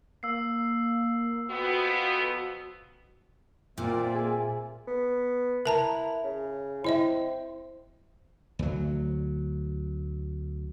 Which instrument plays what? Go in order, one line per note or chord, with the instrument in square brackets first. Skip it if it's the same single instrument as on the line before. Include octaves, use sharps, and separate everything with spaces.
[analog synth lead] A#3 [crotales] E6 C7
[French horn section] F2 B3 [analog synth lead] F#4
[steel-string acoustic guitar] A#2 [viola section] A#3 D5 [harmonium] C4 E5
[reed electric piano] G#4 G#5
[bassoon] B3
[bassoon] E4 [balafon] A#4 A5 A#5
[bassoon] C#3
[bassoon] C4 [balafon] E4 D#5 E5
[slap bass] D2 F#3